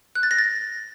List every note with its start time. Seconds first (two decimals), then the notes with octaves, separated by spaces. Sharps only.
0.15 F#6
0.23 A6
0.31 A#6
0.39 A6